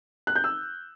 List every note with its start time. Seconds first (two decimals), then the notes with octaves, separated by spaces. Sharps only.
0.27 F#6
0.35 G6
0.44 E6